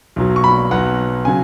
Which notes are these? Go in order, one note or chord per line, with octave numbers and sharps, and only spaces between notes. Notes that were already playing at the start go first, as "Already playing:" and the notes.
B1 B2 F#3
C#6
B5
B1 B2 F#3 F#5
C#3 F#3 G#5